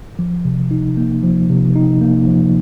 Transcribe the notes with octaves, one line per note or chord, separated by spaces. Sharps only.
F3
C3
D#4
A#3
F3
C3
D#4
A#3
F3